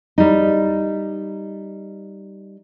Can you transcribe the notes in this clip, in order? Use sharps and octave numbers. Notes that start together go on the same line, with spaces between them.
G3 D#4